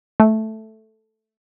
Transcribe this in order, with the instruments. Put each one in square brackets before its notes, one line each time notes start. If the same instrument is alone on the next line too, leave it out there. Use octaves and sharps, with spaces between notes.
[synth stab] A3